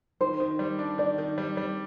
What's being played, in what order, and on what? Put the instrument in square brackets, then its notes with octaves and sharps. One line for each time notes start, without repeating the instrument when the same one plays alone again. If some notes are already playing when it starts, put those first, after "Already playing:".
[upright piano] D#3 [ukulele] C5
[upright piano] D#3
G3
D4
[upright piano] D#3 [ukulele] D5
[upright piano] D#3
G3
G3